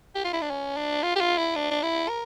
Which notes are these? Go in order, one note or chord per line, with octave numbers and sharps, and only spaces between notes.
G4
F4
E4
D4
C#4
D4
F4
G4
F4
E4
D4
D4
E4
A#4